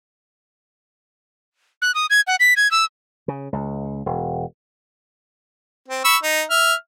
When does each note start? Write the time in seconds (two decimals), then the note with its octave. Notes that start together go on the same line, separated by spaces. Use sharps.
1.82 F#6
1.95 D#6
2.10 G#6
2.27 F#5
2.40 B6
2.57 G#6
2.71 E6
3.28 C#3
3.53 C#2
4.06 E1
5.88 C4
6.05 B5 C#6 E6
6.23 D#4
6.50 E5 F6